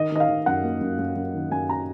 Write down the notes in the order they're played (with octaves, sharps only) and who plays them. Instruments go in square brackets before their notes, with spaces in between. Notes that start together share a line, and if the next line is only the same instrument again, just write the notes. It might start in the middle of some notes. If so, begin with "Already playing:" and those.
Already playing: [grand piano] D#3 D#5
D#3 D#5
F5
D#3
F#2 F#5
A#3
F#2
F#2
F#2
D#3
F#2 G#5
A#5